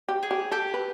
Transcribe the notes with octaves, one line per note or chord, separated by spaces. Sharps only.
G4
G#4
G4
G4 A4
B4